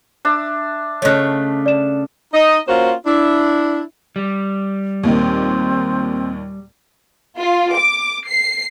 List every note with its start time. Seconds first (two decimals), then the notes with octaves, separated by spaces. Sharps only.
0.25 D4 E5
1.02 C#3 A3 C#5 D#5 F#6
1.66 D5 E7
2.34 D#4 D#5
2.68 A#3 C#4 F4 F#4 C5
3.06 D4 E4
4.16 G3
5.03 D#2 A#2 D#3 C4
7.38 F4
7.75 D6
8.28 C7